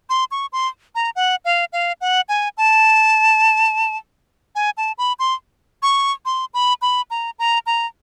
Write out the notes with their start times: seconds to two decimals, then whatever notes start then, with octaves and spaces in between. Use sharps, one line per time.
0.10 C6
0.31 C#6
0.53 C6
0.95 A#5
1.16 F#5
1.45 F5
1.73 F5
2.01 F#5
2.29 G#5
2.58 A5
4.55 G#5
4.77 A5
4.98 B5
5.19 C6
5.83 C#6
6.25 C6
6.54 B5
6.82 B5
7.11 A#5
7.39 A#5
7.66 A#5